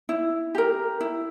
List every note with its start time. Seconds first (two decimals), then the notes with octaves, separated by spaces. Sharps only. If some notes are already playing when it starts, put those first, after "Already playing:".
0.09 E4
0.55 G4 A#4
1.00 E4